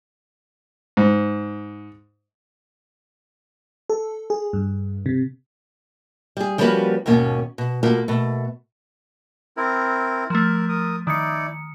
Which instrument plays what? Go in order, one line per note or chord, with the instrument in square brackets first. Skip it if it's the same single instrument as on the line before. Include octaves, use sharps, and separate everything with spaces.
[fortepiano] G#2
[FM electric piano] A4
G#4
G2
C3
[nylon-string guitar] G3 G#4
F3 G3 A#3 C#4 F#4 B4
D#2 G#2 B2 A#3 C#4
B2
B2 A3 A#3 F4
B2 A3
[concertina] C4 E4 A#4
[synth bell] F3 A3 [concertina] A#4
[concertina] A#4 D#6
[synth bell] D#3 C#7 [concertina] D#4 E4 D5